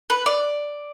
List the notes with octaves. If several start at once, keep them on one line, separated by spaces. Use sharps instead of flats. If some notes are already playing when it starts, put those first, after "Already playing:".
B4
D5